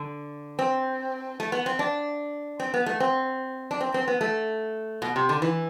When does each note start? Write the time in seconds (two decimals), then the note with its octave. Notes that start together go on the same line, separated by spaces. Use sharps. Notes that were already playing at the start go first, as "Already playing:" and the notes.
Already playing: D3
0.59 C4
1.40 A3
1.52 B3
1.66 C4
1.79 D4
2.60 C4
2.74 B3
2.86 A3
3.00 C4
3.71 D4
3.81 C4
3.94 C4
4.08 B3
4.21 A3
5.02 B2
5.16 C3
5.29 D3
5.42 E3